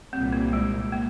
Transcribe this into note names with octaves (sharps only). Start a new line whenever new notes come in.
C2 A#2 G3 C4
A#3
G#3
A#3